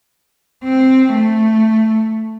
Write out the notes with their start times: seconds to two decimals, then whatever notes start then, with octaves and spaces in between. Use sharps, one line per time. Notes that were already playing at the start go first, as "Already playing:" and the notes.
0.64 C4
1.13 A3